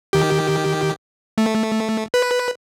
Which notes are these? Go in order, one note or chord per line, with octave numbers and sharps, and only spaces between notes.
D#3 G4
A3
B4